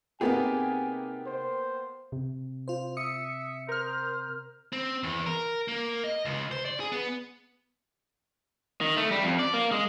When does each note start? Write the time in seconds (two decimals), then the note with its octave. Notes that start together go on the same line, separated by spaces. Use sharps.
0.21 C3 A#3 B3 D#4 G4 G#4 G#5
1.27 C5
2.12 C3
2.68 F4 C5
2.97 E5 D#6 C#7
3.69 A#4 C5 F6
4.73 C4
5.03 E2
5.26 A#4
5.68 A#3
6.04 D#5
6.25 C#2
6.51 C5
6.65 D5
6.80 G#4
6.92 B3
8.81 D#3
8.97 A3
9.11 G3
9.24 F2
9.39 D5
9.54 A#3
9.72 G#3